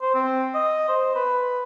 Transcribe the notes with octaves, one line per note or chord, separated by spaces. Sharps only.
C5
C4
D#5
C5
B4